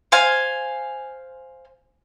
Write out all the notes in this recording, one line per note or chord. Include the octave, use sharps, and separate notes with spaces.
C5 F5 G#5